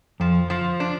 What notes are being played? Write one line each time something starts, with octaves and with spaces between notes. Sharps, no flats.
F2 F3
F3
D4